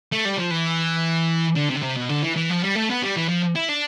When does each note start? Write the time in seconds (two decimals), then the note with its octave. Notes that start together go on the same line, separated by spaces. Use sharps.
0.12 A3
0.25 G3
0.38 F3
0.51 E3
1.56 D3
1.70 C3
1.76 D3
1.83 C3
1.96 B2
2.09 D3
2.23 E3
2.36 E3
2.50 F3
2.63 G3
2.75 A3
2.90 B3
3.03 G3
3.16 E3
3.29 F3
3.55 E4
3.69 D4